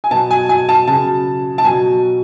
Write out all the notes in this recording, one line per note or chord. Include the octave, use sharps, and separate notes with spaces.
G#5
B2 F#3 A5
G#5
G#5
A5
C#3 F#3 A5
A5
B2 F#3 G#5